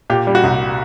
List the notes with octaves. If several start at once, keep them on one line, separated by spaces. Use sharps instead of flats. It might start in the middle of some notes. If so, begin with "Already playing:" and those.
A#2 G4
G3
F#4
C2